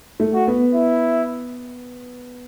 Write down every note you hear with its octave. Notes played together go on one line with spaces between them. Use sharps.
A3
F#4
B3
E4